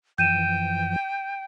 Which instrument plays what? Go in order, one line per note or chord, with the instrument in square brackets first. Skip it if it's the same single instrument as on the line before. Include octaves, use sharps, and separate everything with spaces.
[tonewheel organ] F#2 E3 F3 [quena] G5 [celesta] G6 D#7 E7